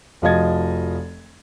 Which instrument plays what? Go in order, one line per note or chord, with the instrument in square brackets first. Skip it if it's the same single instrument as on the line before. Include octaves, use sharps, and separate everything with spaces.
[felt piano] F1 F3 F#4 D#5 G#6 A6